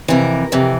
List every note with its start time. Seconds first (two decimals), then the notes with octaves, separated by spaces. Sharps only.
0.08 F2 C3 E3 A#4
0.52 F2 C3 E3